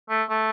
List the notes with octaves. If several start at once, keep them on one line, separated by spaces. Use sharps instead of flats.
A3
A3